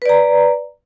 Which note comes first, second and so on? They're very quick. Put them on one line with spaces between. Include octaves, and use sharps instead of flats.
B4 D5 A#5